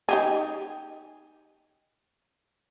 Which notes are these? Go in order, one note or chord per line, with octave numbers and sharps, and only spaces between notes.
D#4 G4 G#4